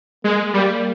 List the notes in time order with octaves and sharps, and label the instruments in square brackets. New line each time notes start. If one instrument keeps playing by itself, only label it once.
[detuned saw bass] G#3 [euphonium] A#3
[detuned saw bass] G3 [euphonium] A#3